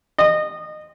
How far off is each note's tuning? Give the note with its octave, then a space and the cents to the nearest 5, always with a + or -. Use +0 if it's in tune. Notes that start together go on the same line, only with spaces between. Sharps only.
D#5 -25